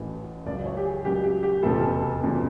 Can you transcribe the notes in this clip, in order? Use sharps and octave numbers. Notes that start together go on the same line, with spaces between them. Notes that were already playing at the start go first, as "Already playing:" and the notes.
Already playing: A1 A2 E3
C#2 C#3 F#3 D5
C#5
G4
G#4
C#2 C#3 F#3 G4
G4
G4
F1 E2 C#3 F3 A4
F1 E2 C#3 F3